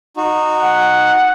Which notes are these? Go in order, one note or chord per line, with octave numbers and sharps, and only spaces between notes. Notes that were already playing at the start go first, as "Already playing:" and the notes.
D#4 F#4
F#5